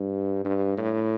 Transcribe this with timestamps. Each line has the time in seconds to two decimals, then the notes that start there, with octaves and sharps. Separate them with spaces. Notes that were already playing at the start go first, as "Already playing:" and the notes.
Already playing: G2
0.44 G2
0.78 A2